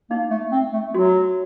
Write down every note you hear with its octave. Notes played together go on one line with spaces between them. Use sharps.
A#3 D#4
A3
C4
A3
F#3 F#4